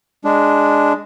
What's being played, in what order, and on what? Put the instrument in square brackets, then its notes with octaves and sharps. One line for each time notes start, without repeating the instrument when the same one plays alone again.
[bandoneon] G#3 D4